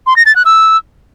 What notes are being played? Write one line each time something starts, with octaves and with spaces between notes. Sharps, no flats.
C6
A#6
A6
F#6
E6